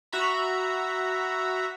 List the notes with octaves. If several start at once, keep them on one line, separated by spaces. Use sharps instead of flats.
F#4 E5 A#5 B5